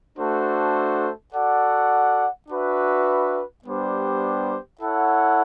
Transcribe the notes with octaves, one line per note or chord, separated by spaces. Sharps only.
A3 D4 F#4 A4 C5
F#4 A4 D5 F#5
D4 F#4 B4 E5
G3 B3 D4 G4 C5
E4 A4 C#5 F#5